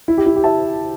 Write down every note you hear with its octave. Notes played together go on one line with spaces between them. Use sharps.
E4
G4
E4
G4
E5 A5